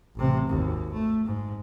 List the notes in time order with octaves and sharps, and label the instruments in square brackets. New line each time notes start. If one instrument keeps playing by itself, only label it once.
[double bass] A1 C3
G#1 D#2
A3
G#2